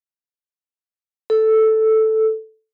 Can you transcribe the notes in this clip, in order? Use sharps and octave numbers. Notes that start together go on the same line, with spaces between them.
A4